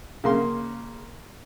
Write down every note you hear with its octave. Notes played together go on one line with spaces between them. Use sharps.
C#3 A#3 C6